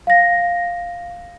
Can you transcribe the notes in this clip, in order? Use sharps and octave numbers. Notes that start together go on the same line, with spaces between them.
F5 A#6